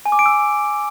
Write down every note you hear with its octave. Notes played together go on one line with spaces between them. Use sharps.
G#5
D6
D7
E6